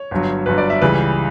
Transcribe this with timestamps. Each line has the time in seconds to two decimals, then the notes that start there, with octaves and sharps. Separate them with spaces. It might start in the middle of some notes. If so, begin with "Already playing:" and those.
Already playing: C#5
0.11 G1 G2 F#3
0.46 G1 G2 F#3 B4
0.58 D5
0.70 E5
0.82 C#2 C#3 E3 G3 B4